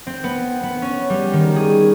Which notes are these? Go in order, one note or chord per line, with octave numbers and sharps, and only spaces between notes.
C4
B3
B3
C#4
G3
D#3
G#4